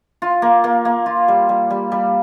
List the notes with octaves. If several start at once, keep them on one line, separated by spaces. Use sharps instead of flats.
F4
A#3
A#3
A#3
F4
G3
G3
G3
G3